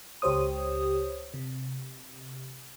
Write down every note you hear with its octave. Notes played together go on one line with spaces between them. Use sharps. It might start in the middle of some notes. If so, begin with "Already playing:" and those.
C#2 G4 C5 C#5 D#6
C3